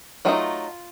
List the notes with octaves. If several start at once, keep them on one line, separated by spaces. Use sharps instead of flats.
F#3 A3 C4 D#4 F4